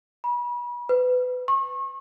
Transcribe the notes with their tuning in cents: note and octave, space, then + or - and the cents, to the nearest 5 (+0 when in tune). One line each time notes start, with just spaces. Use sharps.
B5 -35
B4 +25
C#6 -35